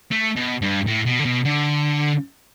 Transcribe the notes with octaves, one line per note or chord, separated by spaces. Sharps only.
A3
B2
G2
A2
B2
D3
B2
D3